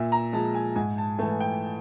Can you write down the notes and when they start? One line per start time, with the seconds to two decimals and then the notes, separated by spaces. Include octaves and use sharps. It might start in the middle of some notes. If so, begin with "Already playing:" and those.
Already playing: A#2 E5
0.12 A#5
0.33 F3 G#3 A5
0.54 G#5
0.76 G#2 G#5
0.98 A5
1.19 E3 A3 A5
1.40 G5